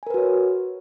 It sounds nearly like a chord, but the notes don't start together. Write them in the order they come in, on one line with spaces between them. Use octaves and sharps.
G#5 A#4 B4 F#4 C#5